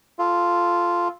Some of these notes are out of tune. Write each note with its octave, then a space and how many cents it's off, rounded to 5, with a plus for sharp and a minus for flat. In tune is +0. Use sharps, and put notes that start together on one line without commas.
F4 -5 A4 -10